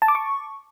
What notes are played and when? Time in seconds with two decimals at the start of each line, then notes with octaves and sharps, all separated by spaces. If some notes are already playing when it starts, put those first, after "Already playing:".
0.02 A5
0.08 D6
0.15 C#6